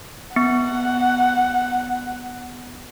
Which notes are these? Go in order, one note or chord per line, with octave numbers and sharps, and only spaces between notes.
B3 F#5